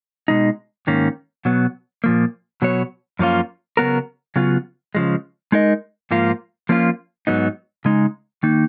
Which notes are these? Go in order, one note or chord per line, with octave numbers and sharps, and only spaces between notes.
B2 G#3 D#4
G#2 D#3 A#3 C#4
B2 F#3 B3
A#2 F3 A#3
B2 F#3 B3 F#4 C#5
F#2 F3 A#3 C#4 F4
C#3 F#3 B3 F#4 A#4
C#3 F#3 B3 F4
C#3 F3 G#3
G#3 D#4 A#4 D#5
G#2 F3 A#3 F4
F3 A#3 C#4 F4
G#2 F#3 B3 D#4
C#3 G#3 D#4
D#3 A#3 D#4